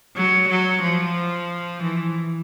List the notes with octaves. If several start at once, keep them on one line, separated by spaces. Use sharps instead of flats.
F#3
F#3
F3
E3